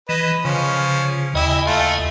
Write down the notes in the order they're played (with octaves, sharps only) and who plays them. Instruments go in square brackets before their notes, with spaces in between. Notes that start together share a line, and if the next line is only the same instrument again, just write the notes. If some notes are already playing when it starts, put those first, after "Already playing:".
[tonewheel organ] E3 [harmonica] B4 D#5
[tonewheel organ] C#3 [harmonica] F3 C#4
[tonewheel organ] D#2 D#5 G#5 [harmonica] E4 G4
[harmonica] A3 F4